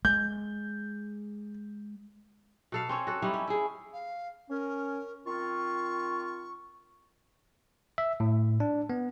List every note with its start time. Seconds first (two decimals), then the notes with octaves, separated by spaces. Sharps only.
0.05 G#3 G6
2.72 B2 A4 F5
2.89 C4 C#4 C#5
3.07 F#4 A4
3.22 G3 A3 D#4 E4
3.34 C#4
3.47 E4 G#4
3.93 F5
4.50 C#4 A#4
5.26 D#3 C4 F4 C#6
7.98 E5
8.20 A2
8.60 D4
8.90 B3